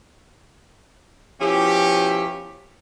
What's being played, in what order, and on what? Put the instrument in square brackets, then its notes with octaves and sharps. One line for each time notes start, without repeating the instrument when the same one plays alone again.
[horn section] B2 F3 C#4 E4 G4